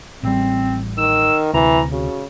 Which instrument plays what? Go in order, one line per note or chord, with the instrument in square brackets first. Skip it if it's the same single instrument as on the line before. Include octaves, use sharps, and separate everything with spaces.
[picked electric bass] A1 G3 [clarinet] C4
[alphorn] D#3 [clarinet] E6
[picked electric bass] D2 C3 [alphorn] E3 [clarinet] A#5
[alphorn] C#3 [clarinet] F#4